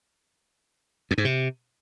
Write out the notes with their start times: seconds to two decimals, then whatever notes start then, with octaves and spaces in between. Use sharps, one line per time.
1.11 F2
1.18 G#2
1.25 C3